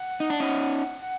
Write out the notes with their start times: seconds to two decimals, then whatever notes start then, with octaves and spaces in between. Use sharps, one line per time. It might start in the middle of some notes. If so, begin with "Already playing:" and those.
Already playing: F#5
0.20 D#4
0.30 D4
0.40 C#4 D#4
1.01 F#5